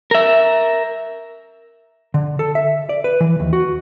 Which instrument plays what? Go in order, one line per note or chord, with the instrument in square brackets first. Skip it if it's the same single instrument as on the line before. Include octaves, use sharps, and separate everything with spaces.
[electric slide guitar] A#4 E5
[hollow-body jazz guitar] D3
A4
E5
D5
B4
E3
D#2
F#4